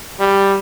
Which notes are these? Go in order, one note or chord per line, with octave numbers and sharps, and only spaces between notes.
G3